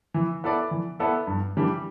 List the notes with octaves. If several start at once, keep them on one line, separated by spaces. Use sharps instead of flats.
E3
B3 E4 A4 D5
E3
B3 E4 A4 D5
G2
E3 G3 D4 G4